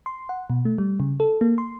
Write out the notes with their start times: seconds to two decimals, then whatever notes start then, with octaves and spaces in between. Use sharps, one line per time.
0.06 C6
0.29 F#5
0.50 B2
0.65 A3
0.78 G3
1.00 C#3
1.20 A4
1.41 A#3
1.58 C6